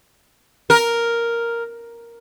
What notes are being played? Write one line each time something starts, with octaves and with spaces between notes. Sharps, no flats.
A#4